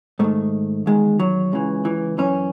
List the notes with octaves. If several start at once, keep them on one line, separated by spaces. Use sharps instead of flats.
G#2 D#3 A3
E2 D#3 G#3
F#3
C#2 C#3 E3
E3
F#2 E3 C#4